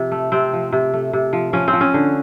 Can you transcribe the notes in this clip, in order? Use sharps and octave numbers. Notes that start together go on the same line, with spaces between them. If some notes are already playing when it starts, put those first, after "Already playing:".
Already playing: C3 F3
A3
C3 C4
F3
C3
A3
C3
F3
F3 C#4
C4
F3
C#4
D3